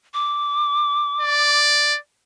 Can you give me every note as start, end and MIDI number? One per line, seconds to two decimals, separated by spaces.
0.14 1.61 86
1.21 1.96 74